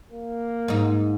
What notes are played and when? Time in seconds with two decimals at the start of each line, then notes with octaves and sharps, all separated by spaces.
0.12 A#3
0.68 G#2 D#4